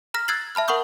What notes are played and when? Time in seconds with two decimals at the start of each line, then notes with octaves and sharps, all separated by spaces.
0.14 A#5 F6 A#6 B6
0.28 E6 F#6 G#6 A6 C7 F#7
0.55 E5 A5 B5 F6
0.68 A#4 F#5 B5 C#6 D#6 G6